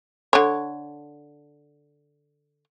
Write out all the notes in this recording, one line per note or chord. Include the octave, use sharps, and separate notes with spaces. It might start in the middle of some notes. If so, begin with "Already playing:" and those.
D3 C#5